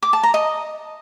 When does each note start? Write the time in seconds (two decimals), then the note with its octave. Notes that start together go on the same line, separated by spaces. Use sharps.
0.03 D6
0.13 A5
0.23 A#5
0.34 D#5